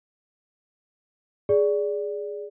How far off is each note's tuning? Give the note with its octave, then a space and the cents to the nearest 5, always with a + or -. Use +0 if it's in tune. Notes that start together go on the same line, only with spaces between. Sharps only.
G#4 +0 D5 -10